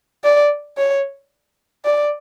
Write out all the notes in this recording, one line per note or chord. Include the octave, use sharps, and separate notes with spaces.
D5
C#5
D5